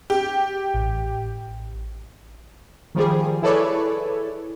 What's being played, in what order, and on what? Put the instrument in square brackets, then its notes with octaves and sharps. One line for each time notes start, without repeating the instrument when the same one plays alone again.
[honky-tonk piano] G4
[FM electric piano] A1
[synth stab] D#3 F3 G3 G#4
E4 G#4 A4 B4 C#5 D5